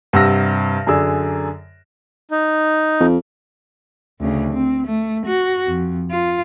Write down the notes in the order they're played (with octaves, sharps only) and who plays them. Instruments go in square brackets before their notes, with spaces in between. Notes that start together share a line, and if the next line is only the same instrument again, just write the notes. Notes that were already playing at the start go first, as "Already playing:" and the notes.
[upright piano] G2 C3 F#5 E6 F6 A#6
F#2 D3 G#4 D5 E6
[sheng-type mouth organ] D#4
[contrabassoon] F2
[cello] D2 C#3
C4
A3
F#4
F2
F4